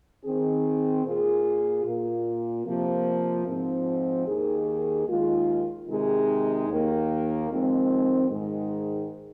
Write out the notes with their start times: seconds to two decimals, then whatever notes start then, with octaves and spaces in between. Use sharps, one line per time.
0.23 D#3 C4 G#4
1.04 A#2 A#3 F4 G#4
1.85 A#2 A#3 F4
2.65 C3 F3 A#3
3.46 G#2 F3 C4
4.26 D#2 D#3 A#3 G#4
5.07 D#2 D#3 G#3 F4
5.88 C3 D#3 G#3 D#4 G#4
6.68 D#2 D#3 A#3
7.49 F2 D#3 G#3 C4
8.29 G#2 D#3 G#3